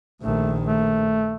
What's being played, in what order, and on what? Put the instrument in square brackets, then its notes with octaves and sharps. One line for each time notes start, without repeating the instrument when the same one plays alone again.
[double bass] A#1 D#3 [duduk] A3
[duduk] A3